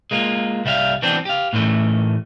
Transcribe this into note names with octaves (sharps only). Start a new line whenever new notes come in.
G#3 A#3 F4
C2 G3 E5 F5
E3 F#3 B3 C4 D4
G4 F5
A2 D#3 E3 A3